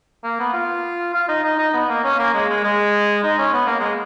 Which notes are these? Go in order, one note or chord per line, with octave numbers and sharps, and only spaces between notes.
A#3
B3
F4
F4
D#4
D#4
D#4
B3
A#3
C#4
A#3
G#3
G#3
G#3
D#4
C#4
B3
A#3
G#3